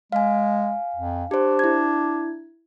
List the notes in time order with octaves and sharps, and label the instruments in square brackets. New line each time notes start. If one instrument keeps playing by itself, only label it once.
[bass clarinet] G#3 [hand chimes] F5 G#5
[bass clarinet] F2
[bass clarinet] D4 [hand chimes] G4 C5
[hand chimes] E4 G#6